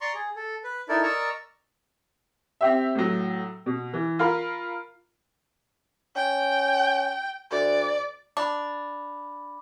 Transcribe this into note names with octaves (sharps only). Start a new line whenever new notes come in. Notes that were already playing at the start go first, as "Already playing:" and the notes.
D5 A#5 C6 C#6
G#4
A4
B4
D#4 E4 A4 A#4 D5
A#4 D5 D#5 A#5 C#6 E6
C4 G4 E5
A2 F#3
B2
E3
F4 A#4 F5 B5
C#4 G5
D2 D5
D4 B5 D6